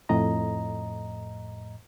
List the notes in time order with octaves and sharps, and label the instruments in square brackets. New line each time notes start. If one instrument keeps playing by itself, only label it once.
[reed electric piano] F2 A2 D#5 A#5